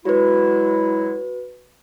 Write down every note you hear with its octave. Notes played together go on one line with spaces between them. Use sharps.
F#3 G#3 E4 F#4 B4